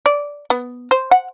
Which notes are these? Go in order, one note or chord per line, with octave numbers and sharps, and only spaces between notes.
D5
B3
C5
F#5